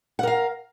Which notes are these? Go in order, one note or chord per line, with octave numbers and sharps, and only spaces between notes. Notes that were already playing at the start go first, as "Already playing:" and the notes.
A#4 F5 F#5